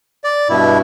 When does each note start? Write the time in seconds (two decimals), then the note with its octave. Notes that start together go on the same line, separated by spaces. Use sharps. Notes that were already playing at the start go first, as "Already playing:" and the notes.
0.24 D5
0.49 G2 B2 E4